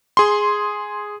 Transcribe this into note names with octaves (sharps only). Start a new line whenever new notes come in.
G#4 C6